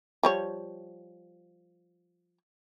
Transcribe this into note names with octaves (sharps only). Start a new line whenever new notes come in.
F3 G3 C#5